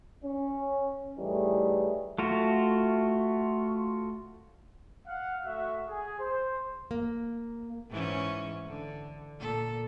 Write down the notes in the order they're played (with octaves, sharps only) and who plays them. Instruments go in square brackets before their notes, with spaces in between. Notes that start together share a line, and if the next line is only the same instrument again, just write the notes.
[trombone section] C#4
A2 E3 G3 A3 D#4 G#4
[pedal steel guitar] A3 F4 F#4
[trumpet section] F5 F#5
A3 F#4 E5 F#5
G#4
C5
[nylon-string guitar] A#3
[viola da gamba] G#2 E3 C#4
D3
A#2 A4